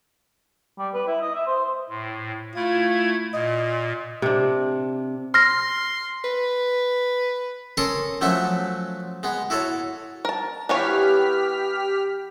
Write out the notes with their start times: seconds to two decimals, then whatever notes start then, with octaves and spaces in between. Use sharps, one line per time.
0.78 G3
0.94 B4
1.07 E4
1.21 D#5
1.35 E5
1.47 C5
1.90 A2
2.55 A3 E4 F4 G#6
3.34 A#2 D#5
4.22 C3 D4
5.34 C6 F6 A#6
6.24 B4
7.77 C#4 A4 A#4 C6 C#6 D#6
8.21 F3 F#3 A3 C#4 E5
9.23 G#3 B3
9.50 E4 F#4 A4 C#5
10.25 A#4 A5
10.69 E3 B3 G4 C#5 F6 B6